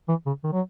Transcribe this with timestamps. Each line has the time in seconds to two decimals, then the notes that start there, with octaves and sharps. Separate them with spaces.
0.08 E3
0.26 C#3
0.44 D#3
0.53 F#3